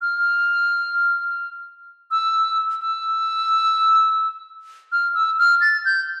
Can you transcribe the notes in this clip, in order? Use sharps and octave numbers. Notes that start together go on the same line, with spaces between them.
F6
E6
E6
F6
E6
F6
A6
G6